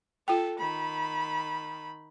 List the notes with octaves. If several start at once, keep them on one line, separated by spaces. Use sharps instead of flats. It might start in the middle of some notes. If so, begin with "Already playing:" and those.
F4 A4 G5
D#3 B5